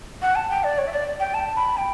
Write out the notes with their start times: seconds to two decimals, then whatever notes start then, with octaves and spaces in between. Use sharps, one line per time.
0.22 F#5
0.35 A5
0.50 G5
0.64 D5
0.78 C#5
0.87 E5
0.92 D5
1.20 G5
1.34 A5
1.56 B5
1.77 G5